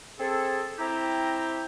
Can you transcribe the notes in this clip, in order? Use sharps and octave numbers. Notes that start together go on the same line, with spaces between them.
C4 G#4 A4
C4 E4 G4 E5 A#5